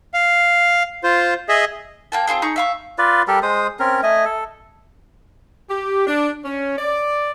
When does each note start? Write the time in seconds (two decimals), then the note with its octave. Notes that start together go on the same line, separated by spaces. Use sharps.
0.14 F5
1.03 F4 C5
1.49 G#4 D#5 E5
2.12 A#3 G5 A5
2.27 C4 C#4 F4 G#4
2.42 D#4 G#4 C#6 G6
2.56 E5 F5 C#6
2.98 F4 B4 D5
3.28 G3 G4 A4 A#4
3.43 G#3 C5 D#6
3.79 C4 C#4 A#4
4.03 A3 D#5 G#5
4.25 A4
5.69 G4
6.07 D4
6.44 C#4
6.78 D5